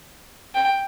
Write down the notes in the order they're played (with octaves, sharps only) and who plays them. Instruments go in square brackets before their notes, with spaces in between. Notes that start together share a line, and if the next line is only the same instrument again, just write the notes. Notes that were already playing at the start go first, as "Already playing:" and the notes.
[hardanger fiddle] G5